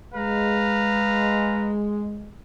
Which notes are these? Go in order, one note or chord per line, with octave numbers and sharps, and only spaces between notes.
G#3 B4 F5 A#5